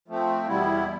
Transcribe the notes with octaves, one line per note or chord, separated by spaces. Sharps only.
F3 A3 C4
E2 B2 G3 B3 E4